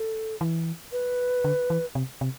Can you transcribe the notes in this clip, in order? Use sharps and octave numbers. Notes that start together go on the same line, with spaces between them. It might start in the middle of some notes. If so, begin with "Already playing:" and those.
Already playing: A4
E3
B4
D3
E3
C3
C3